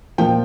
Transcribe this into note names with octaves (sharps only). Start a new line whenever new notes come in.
A#2 F3 G5